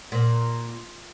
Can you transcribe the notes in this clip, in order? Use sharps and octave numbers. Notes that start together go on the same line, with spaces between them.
A#2